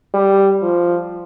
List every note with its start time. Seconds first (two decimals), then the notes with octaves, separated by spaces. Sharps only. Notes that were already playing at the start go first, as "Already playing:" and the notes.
0.14 G3
0.63 F3